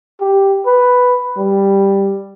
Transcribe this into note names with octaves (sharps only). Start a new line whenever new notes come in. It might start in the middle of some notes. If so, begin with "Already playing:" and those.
G4
B4
G3